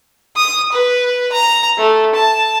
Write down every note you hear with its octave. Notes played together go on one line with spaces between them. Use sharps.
D#6
B4
A#5
A3
A5